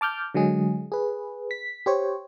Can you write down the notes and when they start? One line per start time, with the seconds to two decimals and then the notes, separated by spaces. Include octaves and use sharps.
0.01 A5 D6 F6 G6
0.34 D3 F#3 G#3 G#4
0.92 G#4 B4
1.51 B6
1.86 G4 C5 C#5